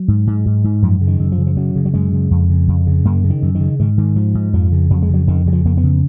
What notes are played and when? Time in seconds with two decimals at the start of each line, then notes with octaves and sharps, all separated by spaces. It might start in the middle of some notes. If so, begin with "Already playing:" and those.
Already playing: F#3
0.08 G#2
0.27 G#2
0.46 G#2
0.64 G#2
0.82 F#2 F3
1.01 C#3
1.07 D#3
1.19 F#2
1.32 F3
1.38 C#3
1.47 F3
1.56 F#2 F#3
1.75 C#3
1.85 F#3
1.94 F#2 G#3
2.13 C#3
2.31 F2
2.49 C#3
2.68 F2
2.87 C#3
3.05 F#2 A#3
3.24 C#3
3.30 D#3
3.42 F#2
3.55 D#3
3.60 C#3
3.79 G#2 D#3
3.98 G#2 D#3
4.16 G#2 F3
4.35 G#2
4.53 F2 F3
4.72 C#3
4.90 F2 F#3
5.02 G#3
5.09 C#3 F#3
5.28 F2 D#3
5.46 C#3 F#3
5.52 F3
5.64 F2 A#3
5.77 B3
5.84 C#3